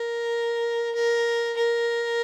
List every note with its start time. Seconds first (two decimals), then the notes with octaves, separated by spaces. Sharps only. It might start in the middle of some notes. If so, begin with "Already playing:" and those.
Already playing: A#4
0.95 A#4
1.57 A#4